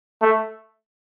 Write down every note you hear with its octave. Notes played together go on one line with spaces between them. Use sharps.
A3